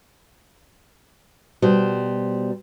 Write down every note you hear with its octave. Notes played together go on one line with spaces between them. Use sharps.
B2 G3 C5